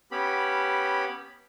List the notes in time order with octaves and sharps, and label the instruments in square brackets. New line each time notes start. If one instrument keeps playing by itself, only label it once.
[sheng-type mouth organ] B3 C#4 G4 B5